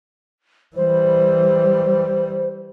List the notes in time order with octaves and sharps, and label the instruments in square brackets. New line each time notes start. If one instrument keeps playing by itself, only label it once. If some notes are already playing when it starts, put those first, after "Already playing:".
[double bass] E3 G3 [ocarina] C5